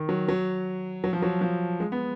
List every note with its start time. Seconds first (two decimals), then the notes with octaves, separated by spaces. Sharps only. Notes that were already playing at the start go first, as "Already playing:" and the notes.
Already playing: D#3
0.09 F#3
0.28 F#3
1.04 F#3
1.13 F3
1.22 F#3
1.41 F3
1.80 G#3
1.92 B3